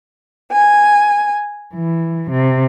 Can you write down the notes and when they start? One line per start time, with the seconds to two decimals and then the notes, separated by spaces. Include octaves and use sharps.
0.52 G#5
1.73 E3
2.30 C3